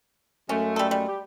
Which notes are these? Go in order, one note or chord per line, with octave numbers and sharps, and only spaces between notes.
F#2 G#3 A3 C#4
G3 A4
G3
G4